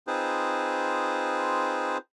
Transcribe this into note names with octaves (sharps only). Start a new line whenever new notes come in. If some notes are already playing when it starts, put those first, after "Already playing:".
C4 D#4 F4 G#4 B4 C5